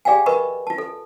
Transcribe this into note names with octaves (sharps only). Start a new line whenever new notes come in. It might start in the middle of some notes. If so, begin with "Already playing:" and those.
G4 G#4 D5 F5 G5 G#5
A#4 B4 D#5 B5 C#6
F4 A5
A4